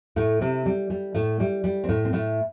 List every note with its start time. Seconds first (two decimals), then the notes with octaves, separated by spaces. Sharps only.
0.16 A2 A3
0.41 C3 C4
0.66 G3
0.90 G3
1.15 A2 A3
1.40 G3
1.64 G3
1.84 C4
1.89 A2 A3
2.05 C4
2.13 A2 A3